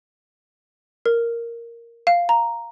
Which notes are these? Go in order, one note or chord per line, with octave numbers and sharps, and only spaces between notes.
A#4
F5
A#5